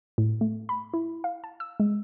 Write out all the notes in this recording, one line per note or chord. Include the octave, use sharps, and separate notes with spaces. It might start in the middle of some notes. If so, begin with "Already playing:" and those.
A2
A3
B5
E4
F5
A5
E6
G#3